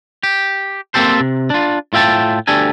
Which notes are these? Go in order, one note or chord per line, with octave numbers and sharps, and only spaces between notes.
G4
A#3 C4 D4 G4 A4 C5
C3
D4 F4
A2 F4 E5 G5 A5
D2 D4 G4 A4 G#5